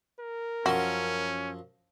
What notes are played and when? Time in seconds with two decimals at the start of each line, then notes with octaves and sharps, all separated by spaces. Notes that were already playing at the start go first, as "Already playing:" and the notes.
0.20 A#4
0.66 F#2 F3 C#4 F#4 C6